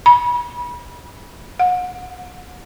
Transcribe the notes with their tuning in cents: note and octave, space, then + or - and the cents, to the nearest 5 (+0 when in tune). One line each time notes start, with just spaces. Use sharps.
B5 -30
F#5 -35